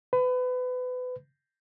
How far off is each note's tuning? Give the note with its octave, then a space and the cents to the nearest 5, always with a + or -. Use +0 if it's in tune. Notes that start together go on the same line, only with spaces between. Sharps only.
B4 +30